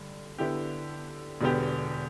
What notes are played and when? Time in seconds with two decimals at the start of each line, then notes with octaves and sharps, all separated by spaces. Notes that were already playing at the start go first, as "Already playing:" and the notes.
Already playing: G2 D3
0.38 D3 B3 E4 G4
1.41 E1 E2 D3 B3 G4